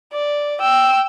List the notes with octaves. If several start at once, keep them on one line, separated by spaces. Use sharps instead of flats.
D5
G5 E6